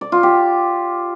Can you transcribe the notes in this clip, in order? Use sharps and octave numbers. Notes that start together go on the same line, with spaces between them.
D5
F4
G4